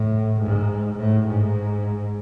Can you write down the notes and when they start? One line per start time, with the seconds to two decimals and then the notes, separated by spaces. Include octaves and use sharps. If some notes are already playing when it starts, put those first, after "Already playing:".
Already playing: A2
0.40 G#2
0.97 A2
1.27 G#2